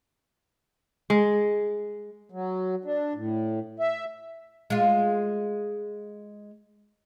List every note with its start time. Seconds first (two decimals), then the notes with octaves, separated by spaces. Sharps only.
1.10 G#3
2.30 F#3
2.85 D4
3.15 A2
3.80 E5
4.70 G#3 F4